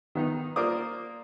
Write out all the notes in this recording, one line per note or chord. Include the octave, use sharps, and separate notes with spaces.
D#3 B3 D#4
A#3 F4 C5 D5 D6 D#6